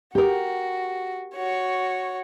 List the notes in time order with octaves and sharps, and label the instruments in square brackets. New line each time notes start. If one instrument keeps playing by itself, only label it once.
[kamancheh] F#4 [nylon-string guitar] G4 A#4
[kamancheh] F#4 C#5